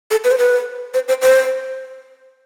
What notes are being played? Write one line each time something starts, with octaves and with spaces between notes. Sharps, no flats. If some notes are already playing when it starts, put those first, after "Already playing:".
A4
B4
C5
B4
C5
C5
C5